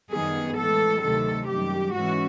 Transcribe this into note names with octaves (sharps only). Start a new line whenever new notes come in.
F#2 D#3 G3 B3 G#4
A2 E3 G#3 A4
D2 C3 D#3 F#3 A3 A4
F#2 D#3 G3 G4
G#2 E3 G#3 C#4 F#4